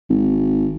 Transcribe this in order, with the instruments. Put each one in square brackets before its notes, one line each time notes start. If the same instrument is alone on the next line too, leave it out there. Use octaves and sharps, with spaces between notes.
[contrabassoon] G#1